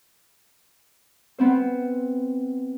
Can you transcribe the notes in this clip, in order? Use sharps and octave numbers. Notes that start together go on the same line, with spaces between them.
B3 C4 C5